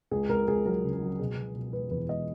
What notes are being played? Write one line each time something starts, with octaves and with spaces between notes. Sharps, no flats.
C#2 G#4
C#2 A#4
C#2 G#4
F#3 A#4
C#3
A#4
F#3
B2 G#4
B2
B2
E1 B4
E2 B4
E1 D#5